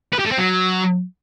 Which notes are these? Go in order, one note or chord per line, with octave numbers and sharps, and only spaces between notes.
B4
G4
A3
C4
F#3